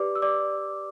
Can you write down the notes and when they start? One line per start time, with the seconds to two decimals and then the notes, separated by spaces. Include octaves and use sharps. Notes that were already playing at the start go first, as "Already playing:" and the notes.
Already playing: G4 B4 D5 D6
0.15 E6
0.22 D5 D6